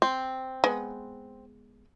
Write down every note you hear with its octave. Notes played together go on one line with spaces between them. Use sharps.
C4
G#3 B3